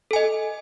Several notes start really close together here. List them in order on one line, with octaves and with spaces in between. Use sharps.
A4 G#5 D#5